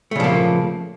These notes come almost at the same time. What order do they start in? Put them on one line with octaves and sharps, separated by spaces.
A3 C#3 F3 A#3